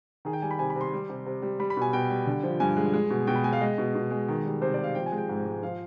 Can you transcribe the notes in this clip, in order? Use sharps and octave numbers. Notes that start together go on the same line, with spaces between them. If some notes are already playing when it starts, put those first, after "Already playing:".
D#3 G#4
G5
G3 G#5
B5
C3 G#5
B5
C3
C6
G3
C3
C3
G3
G3 B5
B5
B2 G#5
B2 G5
G3
D3
F3
G2 G#5
G#3
G#3
B2
B2 G5
B5
G#3 G#5
F5
G#3 D#5
B2
B2
G#3
D#3
G3
C3 C5
D5
C3
F5
F3 G5
G#5
G#3
G5
G#2
G#2
F3 F5